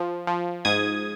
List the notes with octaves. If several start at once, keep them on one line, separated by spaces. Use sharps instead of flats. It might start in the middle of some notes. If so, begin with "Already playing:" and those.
Already playing: F3
F3
G#2 D#6 G#6